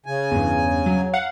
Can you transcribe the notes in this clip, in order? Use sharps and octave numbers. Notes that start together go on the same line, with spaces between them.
C#3 G#5
E2 G2
F#3
F5 F#5